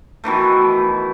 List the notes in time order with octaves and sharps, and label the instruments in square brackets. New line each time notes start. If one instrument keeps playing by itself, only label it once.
[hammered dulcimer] B2 D#3 E3 A3